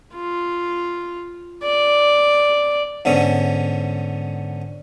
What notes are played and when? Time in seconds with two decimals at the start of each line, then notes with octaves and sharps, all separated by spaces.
0.14 F4
1.64 D5
3.05 G#2 D3 B3 C#4